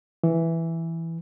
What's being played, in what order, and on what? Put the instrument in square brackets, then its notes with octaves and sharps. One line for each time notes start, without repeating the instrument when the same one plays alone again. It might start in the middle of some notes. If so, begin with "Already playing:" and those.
[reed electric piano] E3